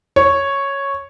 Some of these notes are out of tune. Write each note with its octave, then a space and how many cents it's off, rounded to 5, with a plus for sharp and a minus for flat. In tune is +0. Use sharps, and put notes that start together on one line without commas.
C#5 +0